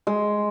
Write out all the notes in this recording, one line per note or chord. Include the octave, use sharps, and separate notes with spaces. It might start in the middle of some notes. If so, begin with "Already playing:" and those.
G#3